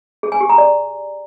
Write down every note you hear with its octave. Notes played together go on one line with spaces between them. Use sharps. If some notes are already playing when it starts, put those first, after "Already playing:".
G#4
G#5
G4
A#5
D5